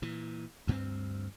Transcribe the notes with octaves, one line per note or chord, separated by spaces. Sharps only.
A#2 E3
D2 G2 A3 C4